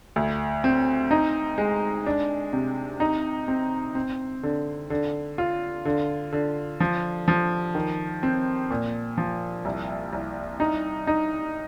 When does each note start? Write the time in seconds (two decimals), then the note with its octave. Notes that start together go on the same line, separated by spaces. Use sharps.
0.16 D2
0.64 C4
1.11 D#4
1.58 G#3
2.06 D4
2.53 C3
3.00 D#4
3.48 C4
3.95 C4
4.43 D3
4.90 D3
5.38 F4
5.85 D3
6.32 D3
6.80 F3
7.28 F3
7.75 D#3
8.23 C4
8.70 A#2
9.18 F3
9.65 C2
10.13 C2
10.60 D#4
11.07 D#4